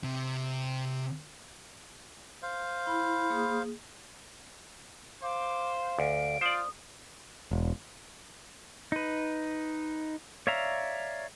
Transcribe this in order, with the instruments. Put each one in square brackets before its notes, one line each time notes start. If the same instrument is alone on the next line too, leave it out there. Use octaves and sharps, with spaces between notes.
[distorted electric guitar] C3
[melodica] C5 F5
[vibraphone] E4 [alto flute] B5
[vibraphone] A#3 G#4 D#6
[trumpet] C5 [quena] F5 [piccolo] D6
[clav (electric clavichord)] D2 [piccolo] D7
[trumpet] F4 [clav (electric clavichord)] C5 D5 [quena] D#6
[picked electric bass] E1
[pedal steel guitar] D#4 B4
C#5 D5 E5 F5 A#5